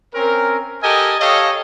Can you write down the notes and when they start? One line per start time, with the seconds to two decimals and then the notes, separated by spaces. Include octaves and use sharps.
0.14 C4 C#4 A#4
0.83 G4 A4 A#4 D#5 G#5
1.20 G4 A4 C#5 D#5 F5